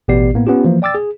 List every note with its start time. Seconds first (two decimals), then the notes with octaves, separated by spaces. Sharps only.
0.08 A1 B2 B3 G4 D5 C7
0.34 A2 A#3 B3
0.47 B3 C#4 F4 G4
0.64 E3 F3 A#3
0.82 D5 G5 D6 E6 A6
0.95 G#4